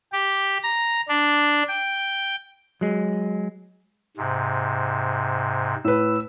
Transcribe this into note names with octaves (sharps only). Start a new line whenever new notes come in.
G4
A#5
D4
G5
F#3 G#3
G#2 C3
A2 B4 E6